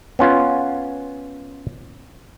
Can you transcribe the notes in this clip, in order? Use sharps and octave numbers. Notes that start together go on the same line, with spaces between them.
B3 C#4 F4